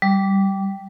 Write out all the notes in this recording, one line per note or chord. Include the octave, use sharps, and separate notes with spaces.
G3